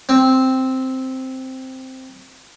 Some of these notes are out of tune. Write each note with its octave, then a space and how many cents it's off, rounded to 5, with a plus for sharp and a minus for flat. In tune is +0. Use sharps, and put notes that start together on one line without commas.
C4 +0